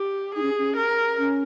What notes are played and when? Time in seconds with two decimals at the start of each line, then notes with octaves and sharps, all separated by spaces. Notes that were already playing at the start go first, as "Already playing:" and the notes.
Already playing: G4
0.35 D#4 G#4
0.42 C#4
0.58 C#4
0.77 A#4
1.18 C#4